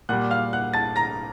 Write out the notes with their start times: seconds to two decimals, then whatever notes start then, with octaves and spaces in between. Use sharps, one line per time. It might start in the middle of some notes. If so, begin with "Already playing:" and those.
0.09 A#2 G3 F#5 F#6
0.31 F5 F6
0.53 F#5 F#6
0.74 A5 A6
0.96 A#5 A#6